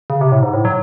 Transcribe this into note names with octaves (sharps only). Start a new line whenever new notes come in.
C#3
C3
A2
G#2
A2
F#3